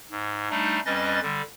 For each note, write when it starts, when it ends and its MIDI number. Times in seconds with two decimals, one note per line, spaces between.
0.11 0.49 44
0.50 0.80 55
0.50 0.80 57
0.50 0.80 62
0.50 0.80 63
0.86 1.20 41
0.86 1.20 55
0.86 1.20 61
0.86 1.20 71
0.86 1.20 75
0.86 1.20 93
1.22 1.42 50
1.22 1.42 55